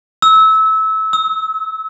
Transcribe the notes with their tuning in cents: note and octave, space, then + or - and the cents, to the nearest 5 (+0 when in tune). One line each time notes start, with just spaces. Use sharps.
E6 -25
E6 -45